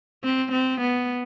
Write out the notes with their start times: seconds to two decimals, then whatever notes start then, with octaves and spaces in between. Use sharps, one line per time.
0.24 C4
0.52 C4
0.81 B3